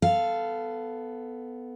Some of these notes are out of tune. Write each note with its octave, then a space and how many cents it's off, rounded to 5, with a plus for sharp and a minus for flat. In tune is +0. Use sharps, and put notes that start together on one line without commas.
B3 +10 A4 +0 F5 -10